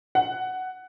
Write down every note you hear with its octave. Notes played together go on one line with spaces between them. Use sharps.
F#5